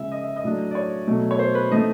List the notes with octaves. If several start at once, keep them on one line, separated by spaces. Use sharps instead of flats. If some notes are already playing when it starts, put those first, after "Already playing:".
Already playing: C#3 F3 G#3 E5
D#5
E5
D#5
A2 F#3 A3 D4
D5
C#5
B2 F#3 A3
C#5
C5
B4
E3 A3 C4 D#4 D#5